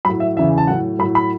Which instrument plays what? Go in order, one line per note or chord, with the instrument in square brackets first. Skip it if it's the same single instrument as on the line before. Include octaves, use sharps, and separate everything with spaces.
[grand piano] A2 F#3 B5
E5
E2 C#3 E3 E5
A5
A2 F#3 F#5
A2 F#3 B5
B5